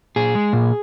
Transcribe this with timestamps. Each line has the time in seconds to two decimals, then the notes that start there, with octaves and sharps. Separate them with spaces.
0.16 A#2 G#4
0.35 G#3
0.53 A#2